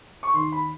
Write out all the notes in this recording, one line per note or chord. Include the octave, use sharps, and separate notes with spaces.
C#6
D#2 C6
B5